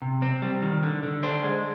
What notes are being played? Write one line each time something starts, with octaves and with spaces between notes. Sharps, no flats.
C3
C4
G3
D#3
D3
D3
D4 C5
G#3